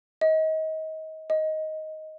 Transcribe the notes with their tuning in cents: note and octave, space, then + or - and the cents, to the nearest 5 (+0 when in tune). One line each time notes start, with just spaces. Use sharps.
D#5 +30
D#5 +10